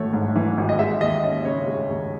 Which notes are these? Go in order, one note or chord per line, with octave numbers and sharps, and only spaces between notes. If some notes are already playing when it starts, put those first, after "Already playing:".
Already playing: G#1 E3 A3 C#5
G#2
E3
G#1
D#5
G#3 E5
D#2 D#5
C#4 D#5
C#3 C#5
G#3
D#2